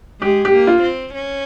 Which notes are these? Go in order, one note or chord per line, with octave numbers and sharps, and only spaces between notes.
G#3 G4
G4
A#3
F4
C4
C#4